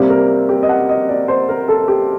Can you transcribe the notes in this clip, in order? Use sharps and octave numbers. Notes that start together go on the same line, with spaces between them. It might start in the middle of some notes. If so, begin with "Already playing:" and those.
Already playing: C3 G3 A#3
A#4
G4
D#5
F#5
D#5
D5
C5
A#4
A4
G4